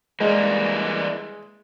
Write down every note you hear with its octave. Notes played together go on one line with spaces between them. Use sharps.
E3 G3 G#3 A#3